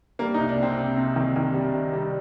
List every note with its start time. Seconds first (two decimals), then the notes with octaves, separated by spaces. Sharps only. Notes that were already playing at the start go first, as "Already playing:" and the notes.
0.19 G3 A#3
0.34 D#4
0.38 C2
0.49 D4
0.58 C3 C4
0.78 C3
0.97 C3
1.16 D#3
1.36 D#3
1.54 G3
1.74 C3
1.93 G3